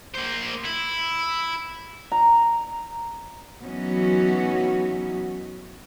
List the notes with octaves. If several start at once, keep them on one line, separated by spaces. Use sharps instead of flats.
A#3 C5
E4
A#5
E3 F#3 B3 C#4 D#4 F#4